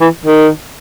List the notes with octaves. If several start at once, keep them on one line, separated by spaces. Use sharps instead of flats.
E3
D#3